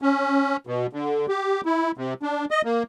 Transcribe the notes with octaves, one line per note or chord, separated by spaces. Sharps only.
C#4
B2
D3
G4
E4
C3
D4
D#5
A#3